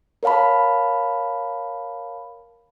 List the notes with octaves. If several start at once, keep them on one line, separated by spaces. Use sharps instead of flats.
A#4 C#5 F5 A5 B5